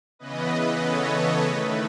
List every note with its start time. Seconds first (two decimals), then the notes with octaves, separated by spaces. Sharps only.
0.19 C#3 E3 B3 B4 D#5
0.81 A4 C#5
1.12 B4
1.43 D#3 A3